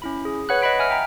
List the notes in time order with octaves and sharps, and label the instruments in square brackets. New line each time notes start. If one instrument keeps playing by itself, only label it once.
[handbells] C#4 E4 B5
G#4
B4 C#5 F#5 B5 F#6
D#5 F#5 B5 B6 D7
E5 G#5 F6
G5 A#5